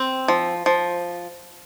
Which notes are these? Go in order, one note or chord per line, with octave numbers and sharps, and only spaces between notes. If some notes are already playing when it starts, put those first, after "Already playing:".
Already playing: C4
F3
F3